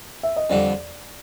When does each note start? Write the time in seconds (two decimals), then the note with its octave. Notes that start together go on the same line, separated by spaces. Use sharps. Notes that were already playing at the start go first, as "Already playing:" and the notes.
0.23 E5
0.36 D#5
0.50 F2 D3 G3 D5